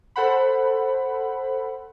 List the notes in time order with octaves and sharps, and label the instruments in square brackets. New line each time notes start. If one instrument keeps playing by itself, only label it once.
[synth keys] A4 C5 F#5 B5